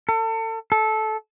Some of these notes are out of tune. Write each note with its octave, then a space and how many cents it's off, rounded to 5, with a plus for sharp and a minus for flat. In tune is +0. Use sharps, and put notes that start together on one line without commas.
A4 +35
A4 -15